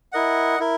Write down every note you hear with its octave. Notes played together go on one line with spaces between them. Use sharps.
E4 A#4 D#5 F#5
E4 A#4